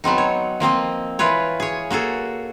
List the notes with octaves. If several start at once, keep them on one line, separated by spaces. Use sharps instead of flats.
F#3 B3 C4 D#4
C#5
F3 A#3 C4 D#5
E3 F4 B4 C#5
G#4 C#5
A#3 F#4 G#4 A4